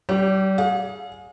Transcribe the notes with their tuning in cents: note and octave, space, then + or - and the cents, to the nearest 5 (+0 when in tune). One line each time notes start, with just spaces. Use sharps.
G3 -35 G4 +0
G#4 +10 F5 +45